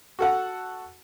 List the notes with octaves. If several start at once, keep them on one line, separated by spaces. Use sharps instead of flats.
F#4 A4 F#5